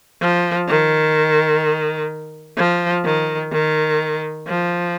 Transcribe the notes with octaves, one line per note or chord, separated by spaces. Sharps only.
F3
D#3
F3
D#3
D#3
F3